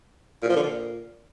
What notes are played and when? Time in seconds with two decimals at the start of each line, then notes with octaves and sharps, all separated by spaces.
0.43 A#2
0.49 F3
0.56 D3
0.63 A#2